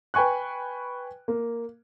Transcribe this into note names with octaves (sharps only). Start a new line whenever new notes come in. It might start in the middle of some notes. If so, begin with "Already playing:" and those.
B4 G5 G#5 C#6 F#6
A#3